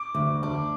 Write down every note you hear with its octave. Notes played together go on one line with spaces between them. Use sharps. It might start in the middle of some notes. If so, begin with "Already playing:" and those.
Already playing: D6
D2
D4 D6